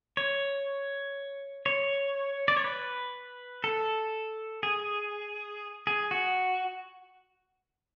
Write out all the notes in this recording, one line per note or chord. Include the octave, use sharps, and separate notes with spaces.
C#5
C#5
D5
C#5
B4
A4
G#4
G#4
F#4